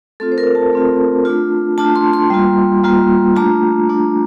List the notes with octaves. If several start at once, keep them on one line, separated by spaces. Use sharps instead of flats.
A3 C4 F4 A4
C5
A#4
A5
A3 C4 F4
A3 D4 F4
A3 D4 F4 A5
C6
C6
G3 A#3 F4
G3 A#3 F4
A3 D4 F4 A#5
A3 D4 F4